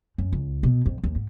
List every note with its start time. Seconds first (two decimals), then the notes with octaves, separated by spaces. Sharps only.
0.18 F#2
0.32 C#2
0.63 B2
0.86 F2
1.04 D#2
1.16 G#2